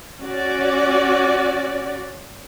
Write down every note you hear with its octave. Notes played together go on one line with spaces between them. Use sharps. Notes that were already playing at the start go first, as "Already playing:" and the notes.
C#4 F#4 D5